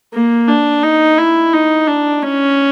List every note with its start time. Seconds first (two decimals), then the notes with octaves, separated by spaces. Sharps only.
0.13 A#3
0.48 D4
0.83 D#4
1.18 E4
1.53 D#4
1.87 D4
2.23 C#4